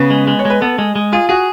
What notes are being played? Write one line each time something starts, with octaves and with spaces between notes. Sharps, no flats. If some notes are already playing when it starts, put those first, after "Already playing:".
Already playing: C#3 B3
G#3
G#3
C#5
G#3 B4
B3 A4
G#3
G#3
F4 G#4
F#4 G#4